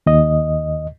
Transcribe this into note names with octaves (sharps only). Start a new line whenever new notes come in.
D#2 D#5